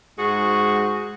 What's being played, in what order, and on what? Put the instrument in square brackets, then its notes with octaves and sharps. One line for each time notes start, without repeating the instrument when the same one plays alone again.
[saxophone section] G#2 F#4 G#4